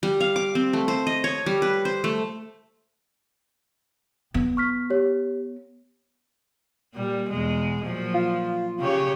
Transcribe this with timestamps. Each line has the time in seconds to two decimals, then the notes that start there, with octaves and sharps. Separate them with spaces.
0.03 G3
0.20 F5
0.36 D6
0.55 C4
0.73 A3
0.88 C5
1.07 D#5
1.24 C#5
1.46 G3
1.62 B4
1.85 C5
2.04 A3
4.34 B3
4.57 C#6 F6 B6
4.90 G4 C#5
6.94 A#2 G3
7.30 E2 B2 G#3
7.83 A#2 F3 F#3
8.15 F4
8.79 C#3 G4 C#5